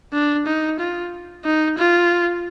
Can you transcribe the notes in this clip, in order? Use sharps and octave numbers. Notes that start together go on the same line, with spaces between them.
D4
D#4
F4
D#4
F4